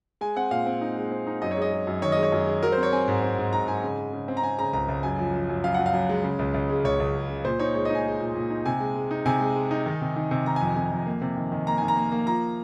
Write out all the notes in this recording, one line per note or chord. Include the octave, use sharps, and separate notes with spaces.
G#3 G#5
C4 F#5
A#2 F5
C4
D#4
G#3
C4
D#4
F#2 D#5
C#5
G#3 D#5
G#3
F#2
D#3 C#5
G#3 D#5
C#5
F#2
G#3
F#3 A#4
C5
C4
C#5
C4 G#5
G#2
C4
G#2
G#2 A#5
G#2 G#5
C#3
C#3
C#3
C4
A#5
C4 G#5
C#3 A#5
C#2 A#5
C#2
F#2 G#5
F3
F3
F#2
F#2 F5
F#2 F#5
F5
F#2
G#3
C#3
C#2
C#2
G#3
C#2 C#5
C#2
G#3
C#3
A#2 C5
D#4 C#5
G#3 C#5
D#4 D#5
G#5
G#3
A#2
A#2
D#4
C3 G#5
G#3
G#3
D#4
C3 G#5
G#3
G#3
D#4
D#3
C3
D#3
C3
D#3 A#5
F2 G#5
C3 G#5
F2
A#3
C3
D#3
D#3
A#3 A#5
D#3 G#5
A#5
A#3
A#3
F3 A#5